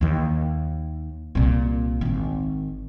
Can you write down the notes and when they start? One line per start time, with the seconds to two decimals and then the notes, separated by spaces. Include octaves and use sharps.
0.01 D#2 D#3
1.35 C2 A#2
2.01 G#1 D#3